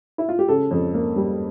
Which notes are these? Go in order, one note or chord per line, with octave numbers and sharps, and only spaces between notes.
E4
F4
G4
C#3 A4
F2
A#3
G3